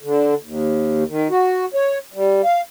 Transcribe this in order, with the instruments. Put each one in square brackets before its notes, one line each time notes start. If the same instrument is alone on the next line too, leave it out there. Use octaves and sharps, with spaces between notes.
[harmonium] D3
D#2
D#3
F#4
C#5
G3
F5